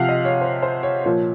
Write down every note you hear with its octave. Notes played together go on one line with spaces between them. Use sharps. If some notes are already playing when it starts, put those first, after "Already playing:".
Already playing: C3 F3 F5 F#5
D#5
C#5
C5
C5
C#5
A#2 F3 C#5